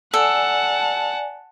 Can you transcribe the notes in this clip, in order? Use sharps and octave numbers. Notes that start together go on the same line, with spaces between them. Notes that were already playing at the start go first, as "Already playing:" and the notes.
A4 D5 F#5 G#5 A5